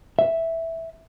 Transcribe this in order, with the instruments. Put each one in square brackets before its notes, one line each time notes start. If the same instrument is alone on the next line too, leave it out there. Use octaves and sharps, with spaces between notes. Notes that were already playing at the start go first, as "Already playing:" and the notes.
[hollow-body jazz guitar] E5